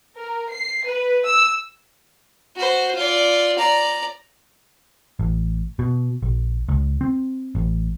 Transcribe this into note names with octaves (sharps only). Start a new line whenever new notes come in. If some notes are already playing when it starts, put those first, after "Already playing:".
A#4
C7
B4
E6
F#4 C5
F4 D5
D5 A#5
A1
B2
A#1
C#2
C4
A1